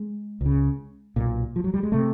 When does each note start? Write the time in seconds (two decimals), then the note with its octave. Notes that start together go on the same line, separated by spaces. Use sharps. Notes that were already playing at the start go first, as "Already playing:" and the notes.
Already playing: G#3
0.41 C#2
0.46 C#3
1.16 B1 A#2
1.56 F3
1.64 F#3
1.74 G3
1.83 G#3
1.92 C3 A3